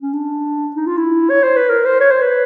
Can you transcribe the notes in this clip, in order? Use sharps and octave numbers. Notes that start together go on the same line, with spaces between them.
C#4
D4
D#4
F4
E4
C#5
C5
B4
A#4
C5
C#5
C5
B4